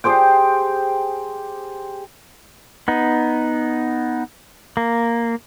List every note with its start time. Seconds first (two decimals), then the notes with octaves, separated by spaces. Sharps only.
0.04 G4 G#4 C5 G5
2.88 B3 D#4
4.77 A#3